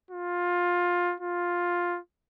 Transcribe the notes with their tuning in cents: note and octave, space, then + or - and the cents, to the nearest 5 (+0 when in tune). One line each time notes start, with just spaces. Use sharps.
F4 +15
F4 +10